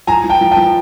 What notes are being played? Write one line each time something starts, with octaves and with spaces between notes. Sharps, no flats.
F3 G#5 A#5
F3
G5 A5
F3
G5 A5
F3